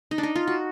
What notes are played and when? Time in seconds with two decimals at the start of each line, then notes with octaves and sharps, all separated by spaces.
0.11 D#4
0.18 D4
0.23 D#4
0.36 F4
0.47 F#4